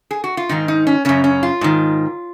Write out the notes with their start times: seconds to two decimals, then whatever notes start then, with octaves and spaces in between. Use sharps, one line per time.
0.11 G#4
0.24 F#4
0.37 F4
0.49 G#2 D#3 D#4
0.68 D#4
0.87 C#4
1.05 F#2 C#3 C#4
1.24 C#4
1.43 F4
1.61 G#2 D#3